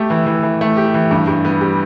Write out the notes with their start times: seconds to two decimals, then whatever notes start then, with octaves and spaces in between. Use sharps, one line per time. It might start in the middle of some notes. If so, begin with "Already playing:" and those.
Already playing: A3 G4
0.10 E3
0.26 E3
0.43 E3
0.61 A3
0.77 G4
0.94 E3
1.11 G2
1.28 G2
1.45 B3
1.61 G3